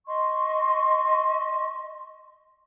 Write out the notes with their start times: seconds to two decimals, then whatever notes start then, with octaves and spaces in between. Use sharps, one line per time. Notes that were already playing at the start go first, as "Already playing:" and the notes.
0.07 D#5 C6 C#6